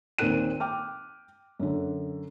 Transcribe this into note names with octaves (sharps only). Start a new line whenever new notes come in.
D#2 A#2 C4 A#4 F#6 D#7
G5 D6 F6
F#2 D3